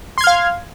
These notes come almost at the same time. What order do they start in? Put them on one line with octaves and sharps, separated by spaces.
C6 G#6 F6 F5